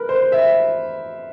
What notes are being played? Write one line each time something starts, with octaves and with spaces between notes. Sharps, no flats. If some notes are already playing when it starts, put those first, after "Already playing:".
Already playing: A#4 B4
C5
E5